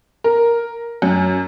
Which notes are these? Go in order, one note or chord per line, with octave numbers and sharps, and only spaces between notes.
A#4
F#2